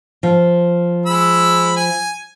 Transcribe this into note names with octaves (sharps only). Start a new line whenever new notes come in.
F3
G#3 B5 E6
G#5